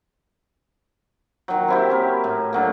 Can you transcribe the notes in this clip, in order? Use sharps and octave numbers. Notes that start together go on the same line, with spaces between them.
D#3 F#3
C4 E4 G4
C#4 A#4
A2
D3 F#3 A#3